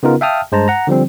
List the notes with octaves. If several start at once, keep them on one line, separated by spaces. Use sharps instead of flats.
C#3 B3 D#4 F4 A#4
E5 F5 G5 A5 D#6 F6
G2 G#3 C5 A5 A#5
F#5 A#5
D3 F3 G3 C4